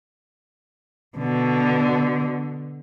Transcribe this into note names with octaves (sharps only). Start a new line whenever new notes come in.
B2 D3